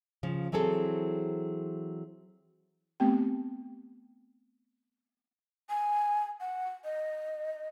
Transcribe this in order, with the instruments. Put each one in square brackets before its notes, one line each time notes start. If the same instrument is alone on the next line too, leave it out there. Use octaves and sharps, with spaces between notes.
[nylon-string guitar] C#3 F3
E3 F#3 C4 G#4 A4
[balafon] A3 B3 C4 G4 G5
[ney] G#5
F#5
D#5